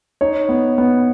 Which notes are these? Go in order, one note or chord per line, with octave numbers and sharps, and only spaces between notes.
D#4 C#5
B3
B3